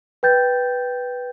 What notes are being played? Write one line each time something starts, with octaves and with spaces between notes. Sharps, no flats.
B4 G5 G6 A6